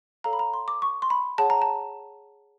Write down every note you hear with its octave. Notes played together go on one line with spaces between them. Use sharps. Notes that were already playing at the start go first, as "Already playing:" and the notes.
A4 C#5 F5 A#5
B5
A#5
C6
D6
C#6
C6
B5
G#4 C#5 F#5 A5
A#5
A5